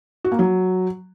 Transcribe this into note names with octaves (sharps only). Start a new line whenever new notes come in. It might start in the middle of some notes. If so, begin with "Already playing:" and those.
F#4
A#3
F#3